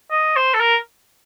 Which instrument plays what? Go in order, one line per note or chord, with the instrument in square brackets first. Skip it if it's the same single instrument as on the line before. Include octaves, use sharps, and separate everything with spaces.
[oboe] D#5
C5
A4
A#4